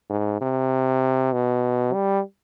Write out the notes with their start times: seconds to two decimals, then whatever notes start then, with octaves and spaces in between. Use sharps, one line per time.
0.10 G#2
0.41 C3
1.33 B2
1.93 G3